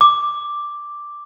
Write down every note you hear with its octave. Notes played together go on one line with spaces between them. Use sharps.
D6